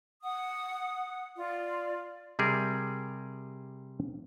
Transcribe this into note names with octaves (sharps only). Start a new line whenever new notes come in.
F#5 D#6
F4 D5
C3 G3 G#4 A#4